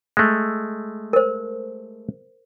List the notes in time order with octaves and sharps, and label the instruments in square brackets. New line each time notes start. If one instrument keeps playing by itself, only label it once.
[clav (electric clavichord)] G#3 A3
[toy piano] A#4 C5